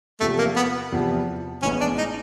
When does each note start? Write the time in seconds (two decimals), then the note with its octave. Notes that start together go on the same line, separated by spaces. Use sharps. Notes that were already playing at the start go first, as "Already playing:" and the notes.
0.20 E2 C3 F3 A3
0.38 A#3
0.56 B3
0.92 E2 C3 F3
1.63 A1 A2 E3 G#3 B3 C#4
1.80 D4
1.98 D#4